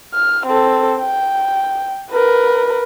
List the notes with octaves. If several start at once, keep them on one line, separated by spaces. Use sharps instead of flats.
F6
C4 A4
G5
A#4 B4